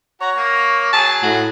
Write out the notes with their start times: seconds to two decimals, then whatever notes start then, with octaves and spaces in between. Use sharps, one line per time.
0.21 F#4 C#5 A#5
0.36 A#3
0.93 F#3 G#4 A5
1.23 A2 F#4